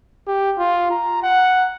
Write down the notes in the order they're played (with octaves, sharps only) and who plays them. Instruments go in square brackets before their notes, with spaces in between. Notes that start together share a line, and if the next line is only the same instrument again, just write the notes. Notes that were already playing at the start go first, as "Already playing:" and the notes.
[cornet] G4
F4
A#5
F#5